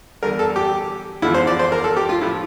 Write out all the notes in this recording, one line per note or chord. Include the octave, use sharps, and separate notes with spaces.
E2 D3 G3 A#4
A4
G4
E2 D3 F3 E4
C5
D5
C5
A#4
A4
G4
F4
A2 F3 E4